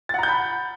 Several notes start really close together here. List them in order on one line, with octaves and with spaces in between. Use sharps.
A6 F#5 A#5 G6 B5